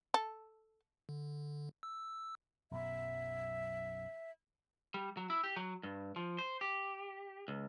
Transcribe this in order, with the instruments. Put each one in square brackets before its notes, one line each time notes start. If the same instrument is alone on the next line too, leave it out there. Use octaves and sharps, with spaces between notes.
[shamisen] A4
[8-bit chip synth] D3
E6
[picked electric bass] B1 F#2 B2 [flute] E5
[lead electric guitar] G3
F#3
E4
G4
F#3
G2
F3
C5
G4
C#2